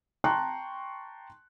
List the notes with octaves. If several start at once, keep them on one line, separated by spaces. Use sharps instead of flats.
G5 A5 A#5 C6 C#6 F#6